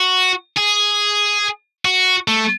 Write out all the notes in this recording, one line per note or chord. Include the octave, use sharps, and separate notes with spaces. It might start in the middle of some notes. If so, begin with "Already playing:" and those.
Already playing: F#4
G#4
F#4
A3